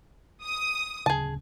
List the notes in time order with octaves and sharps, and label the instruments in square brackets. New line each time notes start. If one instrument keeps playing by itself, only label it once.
[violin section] D#6
[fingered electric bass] D1 C#3 [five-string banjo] G#4 A5